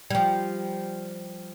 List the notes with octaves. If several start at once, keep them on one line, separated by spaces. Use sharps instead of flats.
F3 G3